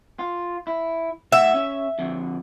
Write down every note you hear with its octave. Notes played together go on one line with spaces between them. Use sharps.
F4
E4
A2 E5 F#5
C#4
F2 D3